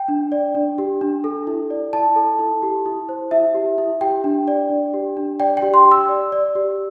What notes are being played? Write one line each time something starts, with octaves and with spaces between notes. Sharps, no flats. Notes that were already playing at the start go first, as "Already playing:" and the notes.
Already playing: G5
D4
D5
D4
G4
D4
A4
E4
D5
E4 A5
A4
E4
G4
E4
C5
E4 E5
G4
E4
G4 G5
D4
D5
D4
G4
D4
D5 G5
G5
G4
C6
G4
E6
D5
D5
G4